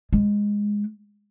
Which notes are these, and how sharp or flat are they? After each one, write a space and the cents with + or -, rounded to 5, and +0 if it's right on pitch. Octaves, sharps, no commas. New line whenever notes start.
G#3 -10